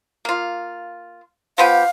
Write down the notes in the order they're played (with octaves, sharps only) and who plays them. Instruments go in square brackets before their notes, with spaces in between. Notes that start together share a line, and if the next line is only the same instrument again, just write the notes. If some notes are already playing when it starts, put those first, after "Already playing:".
[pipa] A#3 F4
[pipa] F3 B3 G4 [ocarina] F5